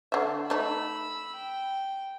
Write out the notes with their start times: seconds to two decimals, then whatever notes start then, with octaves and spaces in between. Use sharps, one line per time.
0.12 D3 E5
0.50 A3 D#4 B5 E6
1.36 G5